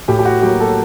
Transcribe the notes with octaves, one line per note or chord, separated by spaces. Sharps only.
A2 G4
G4
F#4
F#3 A#3 G4
A4